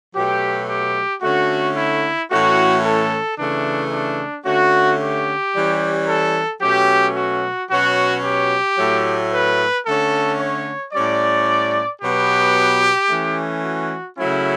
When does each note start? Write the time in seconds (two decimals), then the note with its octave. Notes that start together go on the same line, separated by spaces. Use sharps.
0.14 B2 F#3 A3 G4
0.69 G4
1.22 D3 A3 C#4 F#4
1.76 E4
2.31 A2 E3 A3 C#4 F#4
2.84 A4
3.38 C#3 E3 A3 D4
3.92 D4
4.46 D3 A3 C#4 F#4
5.00 G4
5.54 E3 G3 C#4
6.08 A4
6.62 B2 F#3 A3 C#4 G4
7.16 F#4
7.70 B2 F#3 C#4 F#4
8.24 G4
8.78 A2 F#3 A3
9.32 B4
9.85 D3 A3 C#4 A4
10.40 C#5
10.93 A2 G3 C#4 D5
12.02 B2 F#3 B3 G4
13.10 E3 A3 C#4
13.63 F#4
14.17 C#3 F#3 A3 C#4 E4